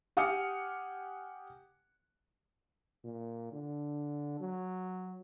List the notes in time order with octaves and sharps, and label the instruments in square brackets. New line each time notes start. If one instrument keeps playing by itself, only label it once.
[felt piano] G4 F#5 G#5 D#6 F6 C#7
[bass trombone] A#2
D3
F#3